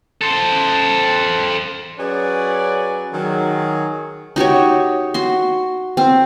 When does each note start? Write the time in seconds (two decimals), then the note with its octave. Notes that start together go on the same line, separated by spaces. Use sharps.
0.22 A4 C5
1.98 F#3 C#4 G#4 B4 C#5 D5
3.12 D#3 F#3 G#4
4.36 D#4 F#4 G4 C#5
5.14 F#4 C6
5.97 C4